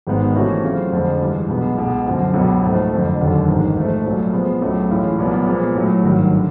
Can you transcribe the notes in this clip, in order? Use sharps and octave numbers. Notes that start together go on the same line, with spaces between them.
G#1 G#2 D#3 G#3 B3
C3 E3 A3 C#4 F#4
C#3 F#3 A3 C4 F4
F2 D3 F3 G#3
G2 E3 G#3
B1 B2 G#3 B3
C#2 B2 G#3
F#2 D3 F3
C#2 B2 F#3 B3
G#2 F3 A3
F#1 F2 D3
F1 D#2 D3 F#3
A1 G#2 D#3
G#2 F3 A3
C2 A#2 F#3 A3
A#2 F3 G#3 B3
C#2 C#3 F#3 A3
A2 E3 G#3 C#4 F4
C2 A#2 F#3 B3
A#2 F3 G#3 B3
A2 F#3 A3
G#1 G2 D#3 F#3
D3